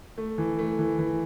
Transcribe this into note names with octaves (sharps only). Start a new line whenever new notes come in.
A3
E3
A3
E3
E3